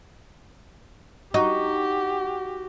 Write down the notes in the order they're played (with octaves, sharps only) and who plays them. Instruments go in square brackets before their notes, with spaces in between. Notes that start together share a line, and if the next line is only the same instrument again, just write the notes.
[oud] D#4 [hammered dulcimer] F#4 [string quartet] G4